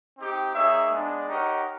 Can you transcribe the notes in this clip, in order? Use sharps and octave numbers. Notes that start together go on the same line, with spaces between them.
C4 D#4 G4
A#3 D#4 G#4 C#5 E5
G#3 B3 D4
D#4 G4 A#4 C#5 F#5